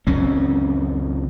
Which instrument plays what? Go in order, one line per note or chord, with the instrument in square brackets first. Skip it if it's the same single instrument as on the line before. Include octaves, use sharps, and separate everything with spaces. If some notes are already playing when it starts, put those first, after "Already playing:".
[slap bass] C#2 F#2 C4 C#4